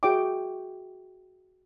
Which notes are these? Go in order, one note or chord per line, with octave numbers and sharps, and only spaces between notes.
F#4 G#4 C#5 E5 G5 D6